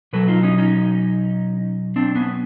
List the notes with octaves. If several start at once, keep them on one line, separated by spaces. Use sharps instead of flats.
B2 F#3 A4 B4
D#4 F4
C#4 D#4
C#4 D#4
C4 D4
B3 C#4